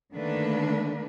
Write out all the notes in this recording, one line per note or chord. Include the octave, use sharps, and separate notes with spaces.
D3 D#3 A3 A#3 D4 B4